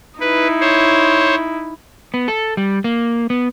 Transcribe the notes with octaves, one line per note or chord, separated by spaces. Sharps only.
D#4 E4 B4
C5 C#5
B3
A4
G3
A#3
B3